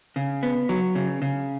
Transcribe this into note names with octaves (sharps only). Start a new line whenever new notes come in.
C#3
B3
F#3
C#3
C#3